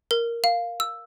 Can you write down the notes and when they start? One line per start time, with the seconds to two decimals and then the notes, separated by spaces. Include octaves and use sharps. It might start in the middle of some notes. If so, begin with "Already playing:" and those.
0.11 A#4
0.44 F5
0.80 E6